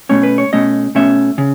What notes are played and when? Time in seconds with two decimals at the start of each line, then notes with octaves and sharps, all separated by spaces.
0.09 B2 A3 C#4 C#5
0.23 B4
0.38 C#5
0.53 B2 A3 C#4 D#5
0.95 B2 A3 C#4 E5
1.38 C#3